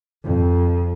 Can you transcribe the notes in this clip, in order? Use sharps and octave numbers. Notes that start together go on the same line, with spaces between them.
F2